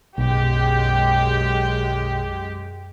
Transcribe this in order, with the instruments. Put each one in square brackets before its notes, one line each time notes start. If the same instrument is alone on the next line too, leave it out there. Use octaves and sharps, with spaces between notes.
[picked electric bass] B1 [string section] F#2 G#3 G4